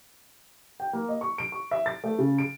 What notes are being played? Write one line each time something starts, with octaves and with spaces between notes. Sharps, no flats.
G5
A#3
D#5
C#6
D7
C#6
E5
A6
A3
C#3
D7